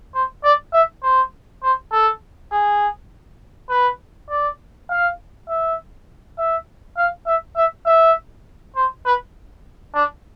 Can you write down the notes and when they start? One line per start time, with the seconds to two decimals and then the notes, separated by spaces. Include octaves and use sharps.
0.14 C5
0.44 D5
0.73 E5
1.03 C5
1.63 C5
1.92 A4
2.52 G#4
3.70 B4
4.30 D5
4.89 F5
5.48 E5
6.38 E5
6.97 F5
7.27 E5
7.56 E5
7.86 E5
8.76 C5
9.05 B4
9.94 D4